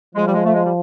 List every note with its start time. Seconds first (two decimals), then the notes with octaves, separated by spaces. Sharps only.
0.15 F3 G#3
0.25 G3
0.34 G#3
0.45 A3
0.53 G#3
0.64 G3